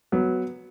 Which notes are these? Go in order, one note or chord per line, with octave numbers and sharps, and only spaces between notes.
F#3 B3